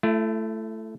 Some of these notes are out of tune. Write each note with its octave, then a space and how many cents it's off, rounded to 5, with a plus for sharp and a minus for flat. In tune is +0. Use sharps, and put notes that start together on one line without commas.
A3 +0 E4 +40